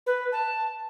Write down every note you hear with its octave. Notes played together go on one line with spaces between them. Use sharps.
B4
A5